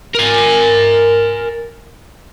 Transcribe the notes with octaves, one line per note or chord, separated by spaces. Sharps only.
A#4 G#5